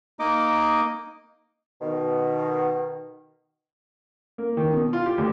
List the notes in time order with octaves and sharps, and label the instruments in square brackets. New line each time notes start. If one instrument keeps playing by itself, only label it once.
[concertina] A#3 D#4 D#5 D6
[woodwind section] B2 D#3
[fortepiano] A#3
D#3
B2
F4
G4
D2